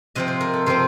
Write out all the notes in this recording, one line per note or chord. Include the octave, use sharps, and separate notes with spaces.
C3 F3 C4 D#5
C5
A#4
A4
C3 F3 C4 C5